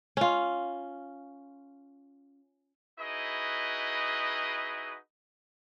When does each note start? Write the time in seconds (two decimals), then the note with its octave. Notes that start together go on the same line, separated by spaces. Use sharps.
0.17 C#4 F4
2.99 D#4 E4 F#4 G#4 B4 D#5